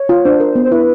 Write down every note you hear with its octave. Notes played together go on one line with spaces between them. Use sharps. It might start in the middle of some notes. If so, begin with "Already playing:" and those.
Already playing: C#5
F4
D4 C5
A#4
B3
C5
E4 B4